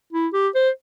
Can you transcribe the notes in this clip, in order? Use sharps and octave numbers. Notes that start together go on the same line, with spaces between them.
E4
G4
C5